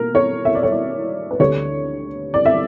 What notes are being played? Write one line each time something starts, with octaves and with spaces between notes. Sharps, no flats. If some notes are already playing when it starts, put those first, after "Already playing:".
Already playing: B2 A#3 A#4
C#5
E5
D5
C#5
D5
B4
D2 D3 G3 C#5
D5
E5